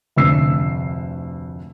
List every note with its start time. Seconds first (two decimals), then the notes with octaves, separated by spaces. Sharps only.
0.16 F1 D2 E6 C7